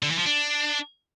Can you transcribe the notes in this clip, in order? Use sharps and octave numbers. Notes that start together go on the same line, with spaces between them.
D3
E3
F3
D4